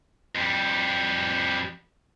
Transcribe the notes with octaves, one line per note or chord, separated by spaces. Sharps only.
F2 G3